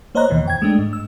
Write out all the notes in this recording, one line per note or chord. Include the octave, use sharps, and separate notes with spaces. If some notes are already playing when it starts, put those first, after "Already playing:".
A#3 C5 C#5 D#5 A#5 F#6
D#2 B2 D#3 E3
F2 G5 G#6
G#3 A3 D4
G#2
E6